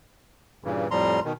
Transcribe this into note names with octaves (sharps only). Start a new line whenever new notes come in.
G2 A#2 C#3 E3
F2 A2 F3 G3 A#5 C6
B2 D#3